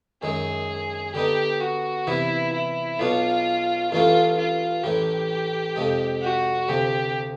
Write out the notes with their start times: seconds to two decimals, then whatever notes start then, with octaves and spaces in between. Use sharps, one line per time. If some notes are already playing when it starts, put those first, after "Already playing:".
0.22 F#2 D#3 G#3 G#4
1.15 D3 G3 B3 D#4 G4
1.60 F#4
2.07 C3 E3 G3 B3 E4
2.53 E4
2.99 B1 B2 F#3 B3 D4 F4
3.92 A1 G2 E3 A3 C#4 F4
4.37 F4
4.83 A1 A2 E3 G4
5.76 F2 C3 F3 G#3
6.22 F#4
6.68 D2 C3 F3 G4